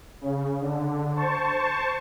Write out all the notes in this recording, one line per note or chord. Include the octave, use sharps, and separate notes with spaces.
C#3
D3
C5 A5 C#6